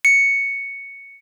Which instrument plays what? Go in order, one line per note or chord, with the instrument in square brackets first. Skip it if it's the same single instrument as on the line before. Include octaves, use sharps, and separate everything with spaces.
[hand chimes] C#7